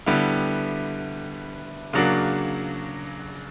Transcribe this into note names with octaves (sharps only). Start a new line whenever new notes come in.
D3 G3 B3 E4
C#3 F#3 A#3 D4 F#4